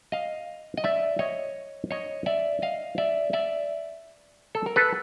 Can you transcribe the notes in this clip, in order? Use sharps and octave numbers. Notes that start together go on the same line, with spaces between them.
D#5 F5
D#5
D5 E5
C#5 D#5
C#5 D#5
D5 E5
D#5 F5
D5 E5
D5 E5
A4
A#4
A4 B4